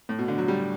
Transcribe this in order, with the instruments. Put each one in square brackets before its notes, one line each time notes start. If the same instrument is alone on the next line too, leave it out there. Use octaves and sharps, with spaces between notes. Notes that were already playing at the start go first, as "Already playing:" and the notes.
[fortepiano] A2
B2
D3
F#3
G3